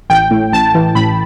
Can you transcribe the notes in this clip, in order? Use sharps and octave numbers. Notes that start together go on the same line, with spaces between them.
A1 G5
A2
A1 A5
E3
A1 B5